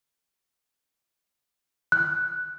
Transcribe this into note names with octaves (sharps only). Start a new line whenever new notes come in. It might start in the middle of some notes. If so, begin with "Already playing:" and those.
F#6